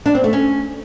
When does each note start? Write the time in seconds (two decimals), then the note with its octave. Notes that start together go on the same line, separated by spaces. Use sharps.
0.06 D4
0.15 C4
0.24 A3
0.33 C#4